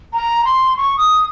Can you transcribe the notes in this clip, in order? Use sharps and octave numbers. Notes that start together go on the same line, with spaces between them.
A#5
C6
C#6
D#6